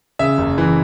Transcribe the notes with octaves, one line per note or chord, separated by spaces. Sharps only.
C#3 E5
F#1
E3